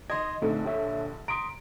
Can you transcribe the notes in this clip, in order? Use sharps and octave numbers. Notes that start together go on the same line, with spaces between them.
D#3 D#5 C6 G#6
A#1 D3 A3 C4 D#4
G4 C#5 E5
A#5 C6 D#6 D7